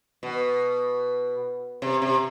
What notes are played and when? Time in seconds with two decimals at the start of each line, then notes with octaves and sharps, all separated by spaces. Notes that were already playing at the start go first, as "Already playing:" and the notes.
0.23 B2
1.82 C3
2.02 C3